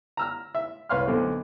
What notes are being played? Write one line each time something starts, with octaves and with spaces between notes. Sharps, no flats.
A#5 E6 F6
E5
C2 B4 C#5 F5 C6 F6
B1 D3 C4